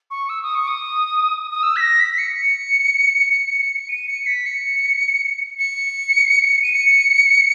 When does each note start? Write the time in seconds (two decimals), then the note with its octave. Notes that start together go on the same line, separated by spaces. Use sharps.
0.11 C#6
0.29 E6
0.43 D#6
0.55 C#6
0.68 D#6
1.51 D#6
1.63 E6
1.76 B6
1.81 A#6
2.00 B6
2.14 B6
2.18 C#7
3.89 D#7
4.08 C#7
4.27 B6
4.46 C#7
5.59 C#7
6.63 D#7
6.73 C#7